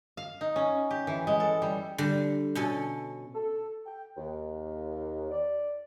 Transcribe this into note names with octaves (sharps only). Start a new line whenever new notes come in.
F5
D#4
C#4
G4
E3
G#3
A4
G3
D3 G3
B2 C#4 A4
A4
G5
D#2
D5